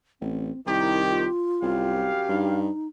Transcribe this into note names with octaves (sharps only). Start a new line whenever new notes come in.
A1 C4
C2 D#3 E4 G4
F4
C2 F#2 G4 F5
G2 D#4